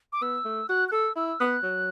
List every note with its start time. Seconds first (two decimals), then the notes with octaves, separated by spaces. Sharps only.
0.13 D6
0.22 B3 E6
0.45 A3
0.69 F#4 F#6
0.89 F#6
0.92 A4 E6
1.16 E4 E6
1.40 B3 F#6
1.63 F#3